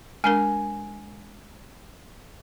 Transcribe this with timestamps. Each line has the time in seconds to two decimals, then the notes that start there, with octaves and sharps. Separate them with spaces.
0.24 G#3 D4 A#4 G#5